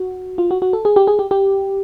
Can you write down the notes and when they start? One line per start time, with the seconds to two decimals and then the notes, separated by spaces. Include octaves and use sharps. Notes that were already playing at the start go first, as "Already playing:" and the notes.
Already playing: F#4
0.38 F4
0.51 F#4
0.62 F#4
0.73 A4
0.85 G#4
0.96 G4
1.07 G#4
1.19 G4
1.31 G4